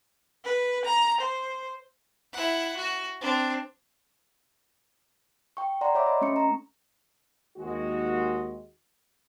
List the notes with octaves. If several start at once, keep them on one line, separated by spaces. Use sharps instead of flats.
B4
A#5
C5
E4 F#5
F#4
C4 D4
G5 C#6
D5 F#5 A#5 C6
C#5 E5 B5 D6
D#5 C6
A3 C#4 C#6 C#7
A#5
D#2 G#3 F#4